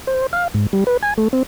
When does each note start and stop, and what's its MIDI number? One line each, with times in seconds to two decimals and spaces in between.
0.07 0.27 72
0.33 0.48 77
0.54 0.67 44
0.73 0.84 55
0.87 0.97 71
1.03 1.14 80
1.18 1.28 57
1.33 1.43 60